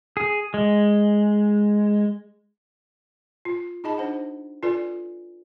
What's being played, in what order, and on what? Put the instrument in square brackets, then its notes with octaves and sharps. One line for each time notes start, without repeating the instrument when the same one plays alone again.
[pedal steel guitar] G#4
G#3
[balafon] F4
D#4 G#4 D#5 A5 B5
D4 C5 F#5
F4 A4 B4 D5 G#5